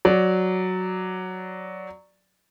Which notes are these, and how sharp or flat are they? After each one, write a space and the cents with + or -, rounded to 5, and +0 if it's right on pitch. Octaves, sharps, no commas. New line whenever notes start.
F#3 +0 D5 +0